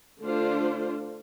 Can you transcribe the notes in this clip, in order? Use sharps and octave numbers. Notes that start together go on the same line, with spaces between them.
D3 A3 D4 F4 C5